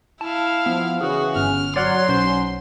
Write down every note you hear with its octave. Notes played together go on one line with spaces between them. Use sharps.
E4 F5 A5
F3 B3
C#3 E3 F#4 G#4
G1 C#4 F6
F#3 C#5 D5 F#5 C6 F#6
B1 C#4 C5